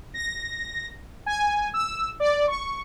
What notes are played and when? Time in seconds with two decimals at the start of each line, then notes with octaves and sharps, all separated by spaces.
0.14 A#6
1.26 G#5
1.74 E6
2.20 D5
2.48 C#6